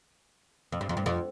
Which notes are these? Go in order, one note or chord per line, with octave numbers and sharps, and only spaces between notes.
F2
G2
F2
G2
F2